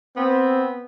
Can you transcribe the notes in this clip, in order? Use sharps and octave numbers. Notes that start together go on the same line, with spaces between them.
B3 C4